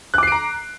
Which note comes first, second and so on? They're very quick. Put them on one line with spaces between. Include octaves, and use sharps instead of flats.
F#6 D6 C7 D7 A#5